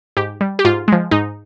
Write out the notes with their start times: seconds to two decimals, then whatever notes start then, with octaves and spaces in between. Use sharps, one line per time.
0.17 G#2 G4
0.41 G3
0.59 G4
0.65 G#2 F4
0.88 F3 G#3
1.11 G#2 D#4